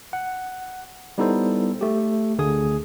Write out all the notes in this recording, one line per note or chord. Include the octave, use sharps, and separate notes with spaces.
F#5
G3 B3 D#4 E4 A4 C5
A3 G4
D2 D3 G#4 G#5 D#6